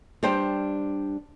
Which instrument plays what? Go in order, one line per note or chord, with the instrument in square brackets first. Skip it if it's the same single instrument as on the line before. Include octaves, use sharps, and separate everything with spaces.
[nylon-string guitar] G3 D4 C5 G5